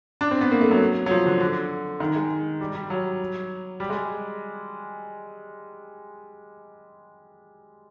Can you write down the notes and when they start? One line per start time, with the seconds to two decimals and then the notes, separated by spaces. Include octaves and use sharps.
0.21 D4
0.31 C4
0.41 B3
0.51 A#3
0.61 A3
0.71 F#3
1.06 F#3
1.11 F3
1.26 D3
1.41 D3
2.00 D#3
2.16 G#3
2.61 G3
2.75 G3
2.90 F#3
3.80 G3
3.90 G#3